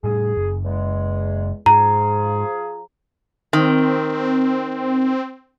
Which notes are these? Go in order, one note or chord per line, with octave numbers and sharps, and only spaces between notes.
A2 G3 G#4
F#1
E2 G#3
G#2 F3 F4 G#4 A#5
D#3 C4